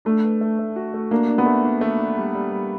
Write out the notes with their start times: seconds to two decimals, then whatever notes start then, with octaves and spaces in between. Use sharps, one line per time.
0.05 A3 D4
0.23 B4
0.41 A3
0.59 A3
0.76 F#4
0.94 A3
1.11 A#3 D4
1.29 D4
1.38 B3
1.46 A3
1.65 D4
1.81 A3
1.99 D4
2.17 G3
2.35 G3
2.52 G3